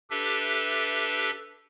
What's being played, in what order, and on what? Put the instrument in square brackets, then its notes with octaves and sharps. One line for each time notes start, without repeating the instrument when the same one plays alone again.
[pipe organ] D4 G4 A4 B4 E5